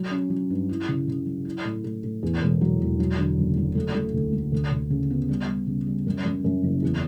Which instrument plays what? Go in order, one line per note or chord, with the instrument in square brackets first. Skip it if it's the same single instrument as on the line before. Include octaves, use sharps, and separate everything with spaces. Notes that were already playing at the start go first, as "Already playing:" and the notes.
Already playing: [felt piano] F#3
C#4
F#3
G2
E4
C#3
C#3
F#3
E4
A2
A2
A2
E2
E1
F#3
E1
F#3
D3
F#1
F#3
A3
A3
D2
A3
D2
D2
C#3
B3
G3
G3
C#3
G3
F#2
F#2
F#2
F#1
E2